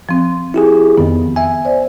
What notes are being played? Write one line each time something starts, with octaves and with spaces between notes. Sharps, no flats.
F3 C4
E4 G4 G#4
F2 D#3 B3
E5 G#5
C5 D5